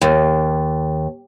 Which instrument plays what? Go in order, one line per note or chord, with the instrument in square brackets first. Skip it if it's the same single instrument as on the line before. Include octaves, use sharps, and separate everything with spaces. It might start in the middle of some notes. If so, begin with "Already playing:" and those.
[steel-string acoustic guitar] D#2